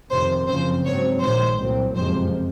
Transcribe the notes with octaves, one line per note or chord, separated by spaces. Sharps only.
F2 C3 D#3 C5
F#2 C#3 F3 C4 C5
G#2 F#3 C4 C#5
A#1 G#2 D#3 G#3 C5
C2 A#2 F#3 C4
F#1 F2 C3 F3 G#3 C5